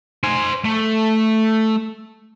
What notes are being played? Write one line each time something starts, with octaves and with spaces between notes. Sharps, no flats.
C5 G#5
A3